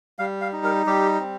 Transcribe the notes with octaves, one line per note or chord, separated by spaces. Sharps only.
G3 F5
F5
D#4
A#4
G3 G4
C4